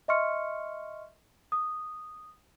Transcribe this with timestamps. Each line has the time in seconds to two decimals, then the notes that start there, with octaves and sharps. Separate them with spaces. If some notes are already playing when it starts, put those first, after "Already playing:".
0.08 D#5 E5 C6 C#6 F6 C#7
1.52 D#6